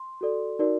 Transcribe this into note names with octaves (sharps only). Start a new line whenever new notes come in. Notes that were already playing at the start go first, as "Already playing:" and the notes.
Already playing: C6
F#4 A4 D5
D#4 F#4 A#4 D5